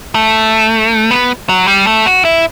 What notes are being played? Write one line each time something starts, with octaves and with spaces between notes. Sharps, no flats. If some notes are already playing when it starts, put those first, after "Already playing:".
A3
B3
F#3
G3
A3
F#4
E4